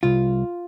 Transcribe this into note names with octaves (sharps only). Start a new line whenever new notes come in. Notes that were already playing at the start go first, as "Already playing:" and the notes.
C2 F4